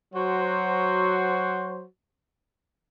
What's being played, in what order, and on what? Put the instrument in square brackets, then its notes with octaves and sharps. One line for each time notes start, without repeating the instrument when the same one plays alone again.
[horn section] F#3 F#4 C5